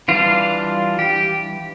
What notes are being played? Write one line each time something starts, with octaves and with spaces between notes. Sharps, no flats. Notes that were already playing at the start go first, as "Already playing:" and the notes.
E3 G3 D4 F4
G4